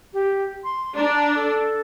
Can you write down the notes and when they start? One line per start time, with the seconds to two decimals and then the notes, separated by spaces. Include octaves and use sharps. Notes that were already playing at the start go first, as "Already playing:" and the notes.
0.13 G4
0.64 C6
0.96 D4 A#5
1.35 A4